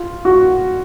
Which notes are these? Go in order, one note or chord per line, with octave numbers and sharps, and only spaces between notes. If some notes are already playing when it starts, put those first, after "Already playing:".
Already playing: F4
F#4